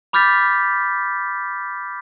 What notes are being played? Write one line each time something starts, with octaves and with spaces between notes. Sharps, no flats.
B5 D6 F6 G6 A6 B6